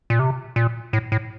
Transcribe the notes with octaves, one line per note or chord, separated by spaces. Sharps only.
A#2
C3
A#2
A2
A2